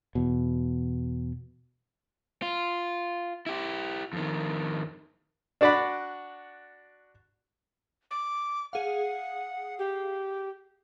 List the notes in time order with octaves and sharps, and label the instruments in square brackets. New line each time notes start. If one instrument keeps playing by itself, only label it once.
[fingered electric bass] E2 B2
[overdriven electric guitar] F4
E4 G4
F2 D#3
[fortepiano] D4 F#4 D5 F#5 B5
[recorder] D6
[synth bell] G#4 F5 [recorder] F#5
[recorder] G4